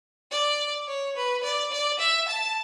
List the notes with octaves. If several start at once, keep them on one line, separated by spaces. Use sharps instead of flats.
D5
C#5
B4
D5
D5
E5
A5